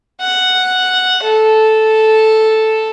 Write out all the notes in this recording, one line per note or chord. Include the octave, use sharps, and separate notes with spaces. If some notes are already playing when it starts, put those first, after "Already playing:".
F#5
A4